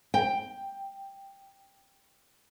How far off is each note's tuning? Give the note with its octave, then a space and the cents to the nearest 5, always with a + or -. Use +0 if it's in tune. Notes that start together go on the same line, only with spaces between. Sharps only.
G5 +5